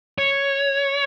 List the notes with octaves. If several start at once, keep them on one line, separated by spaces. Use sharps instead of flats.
C#5